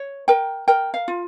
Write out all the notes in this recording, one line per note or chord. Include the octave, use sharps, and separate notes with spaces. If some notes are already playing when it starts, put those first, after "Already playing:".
Already playing: C#5
A#4 G5
A#4 G5
F5
F4